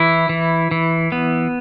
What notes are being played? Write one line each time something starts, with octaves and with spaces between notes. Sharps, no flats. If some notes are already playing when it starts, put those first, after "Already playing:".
Already playing: E3 E4
E3
E3
B3